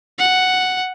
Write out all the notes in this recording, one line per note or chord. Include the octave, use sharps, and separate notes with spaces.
F#5